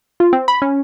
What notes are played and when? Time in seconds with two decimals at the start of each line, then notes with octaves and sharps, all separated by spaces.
0.20 F4
0.33 C4
0.48 B5
0.62 C#4